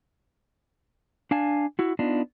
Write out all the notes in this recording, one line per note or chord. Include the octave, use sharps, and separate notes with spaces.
D4 F5 G#5 A5
E4 F#4
B3 D4 D#4 F4